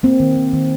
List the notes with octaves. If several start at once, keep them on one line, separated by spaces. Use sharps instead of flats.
A#3 C4
D#3
D#3
D#3